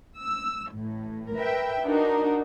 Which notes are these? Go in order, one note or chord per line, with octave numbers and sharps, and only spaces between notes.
E6
A1 A2
A#4 B4 E5 G5
D4 D#4 F#4 A#4